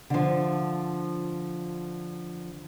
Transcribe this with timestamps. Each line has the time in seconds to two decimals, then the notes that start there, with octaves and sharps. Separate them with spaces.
0.10 D3 F3